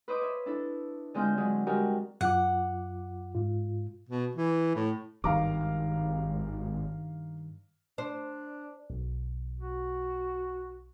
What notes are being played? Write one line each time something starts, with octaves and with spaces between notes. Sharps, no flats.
B4 C5 D#5 D6
C#5 E5
D4 E4 A4
D3 G#3 C4 F4 G6
D3 F#3 G#3
G3 G#3 F#4 G4 A#4
F#2 F4 F#5 D6
G#2 F4
B2
E3
A2
G#1 G2 D#3 G3 F5 A#5 D6
D4 C5
B1
F#4